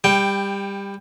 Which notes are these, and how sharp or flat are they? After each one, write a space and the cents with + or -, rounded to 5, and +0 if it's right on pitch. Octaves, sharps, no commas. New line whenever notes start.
G3 +20 G5 +0